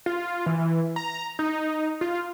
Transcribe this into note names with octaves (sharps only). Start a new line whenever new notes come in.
F4
E3
A#5
D#4
F4